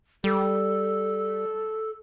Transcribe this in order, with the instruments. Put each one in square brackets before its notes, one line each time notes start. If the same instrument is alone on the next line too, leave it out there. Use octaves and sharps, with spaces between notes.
[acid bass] G3 [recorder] A4